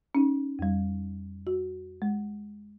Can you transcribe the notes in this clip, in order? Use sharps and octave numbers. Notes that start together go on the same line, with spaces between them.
C#4 D#4
F2 G3
F#4
G#3